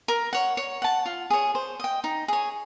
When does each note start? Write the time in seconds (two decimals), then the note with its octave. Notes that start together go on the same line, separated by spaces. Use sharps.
0.08 A#4
0.33 C#5 F#5
0.57 C#5
0.82 F#5 A5
1.06 F4
1.30 G#4 C#5
1.55 C5
1.80 D#5 G5
2.04 D#4
2.28 G#4 C#5